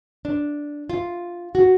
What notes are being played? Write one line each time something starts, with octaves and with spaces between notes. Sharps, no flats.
D4
F4
F#4